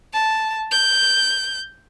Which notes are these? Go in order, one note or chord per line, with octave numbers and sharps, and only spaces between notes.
A5
G6